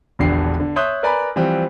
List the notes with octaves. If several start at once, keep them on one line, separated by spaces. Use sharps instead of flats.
E1 A#1 E2 D3 G4 C7
D3
C#5 E5 C6 D#6 F#6 G6
A#4 B4 D5 G#5 A#5 B5
E3 F3 G3 C4